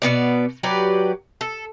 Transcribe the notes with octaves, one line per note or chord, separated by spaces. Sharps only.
B2 D3 B3 D5
F#3 G4 B4 D5
A4